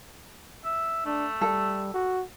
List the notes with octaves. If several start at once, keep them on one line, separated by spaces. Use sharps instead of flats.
E5
A3 D4
G3 A4
F#4